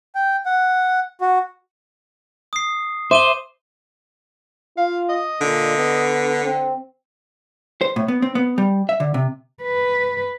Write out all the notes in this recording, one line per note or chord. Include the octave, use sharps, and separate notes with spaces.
G5
F#5
F#4
D#6 C7
C5 E5 D6 D#7 G7
F4 F5
D#5
A#2 D3
B3
C4
C5
A2
B3
C4
B3
G3
E5
D3
C3
B4